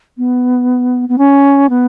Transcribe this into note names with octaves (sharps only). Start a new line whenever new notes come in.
B3
B3
C#4
B3